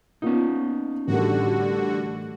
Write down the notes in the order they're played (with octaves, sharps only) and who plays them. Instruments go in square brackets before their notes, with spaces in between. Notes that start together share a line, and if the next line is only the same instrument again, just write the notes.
[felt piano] A#3 B3 F4 [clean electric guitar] C#4 D#4
[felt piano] A1 A2 A#4 [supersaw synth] D3 F#4 [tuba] G3